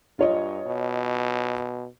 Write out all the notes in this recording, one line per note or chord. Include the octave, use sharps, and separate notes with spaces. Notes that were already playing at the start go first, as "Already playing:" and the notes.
G2 F4 C#5 D#5
B2